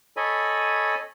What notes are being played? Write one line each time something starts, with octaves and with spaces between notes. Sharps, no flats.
A4 C#5 D#5 G#5 B5